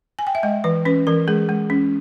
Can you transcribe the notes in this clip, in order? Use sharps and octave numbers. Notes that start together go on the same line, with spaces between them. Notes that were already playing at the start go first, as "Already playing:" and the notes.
G#5
G5
E5
G#3 D#5
E3 B4
C#4 B4
E3 A#4
G#3 G#4
G#3
C#4